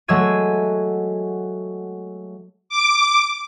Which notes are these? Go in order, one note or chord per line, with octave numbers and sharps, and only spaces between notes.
F#3 G#3 A3 E6 G#6 D#7
D6